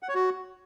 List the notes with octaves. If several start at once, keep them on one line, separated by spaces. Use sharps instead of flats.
F#5
C#5
F#4